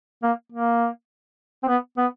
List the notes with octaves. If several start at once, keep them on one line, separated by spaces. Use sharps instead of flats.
A#3
A#3
C4
B3
B3